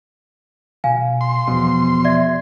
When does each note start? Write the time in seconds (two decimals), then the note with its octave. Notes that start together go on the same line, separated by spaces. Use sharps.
0.84 B2 F5 G#5
1.21 C6
1.48 E2 B2 F3
2.05 D5 E5 G#6